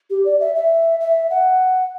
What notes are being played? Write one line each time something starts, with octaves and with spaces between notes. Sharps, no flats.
G4
D5
E5
E5
E5
F#5